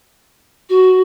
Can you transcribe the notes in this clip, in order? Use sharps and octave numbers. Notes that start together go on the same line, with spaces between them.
F#4